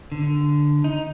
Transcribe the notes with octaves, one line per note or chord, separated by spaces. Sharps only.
D3
D#4